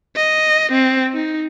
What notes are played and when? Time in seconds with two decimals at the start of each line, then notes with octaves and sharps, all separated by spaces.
0.16 D#5
0.72 C4
1.13 D#4